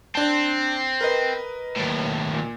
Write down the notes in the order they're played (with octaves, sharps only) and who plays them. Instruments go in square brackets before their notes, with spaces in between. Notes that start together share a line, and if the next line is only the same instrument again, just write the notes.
[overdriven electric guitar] C4 [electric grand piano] D4 A5
[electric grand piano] A#4 B4 D#5
[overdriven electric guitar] D#2 A2
[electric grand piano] A#2